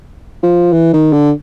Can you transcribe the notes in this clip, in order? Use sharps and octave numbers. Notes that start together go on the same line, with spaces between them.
F3
E3
D#3
D3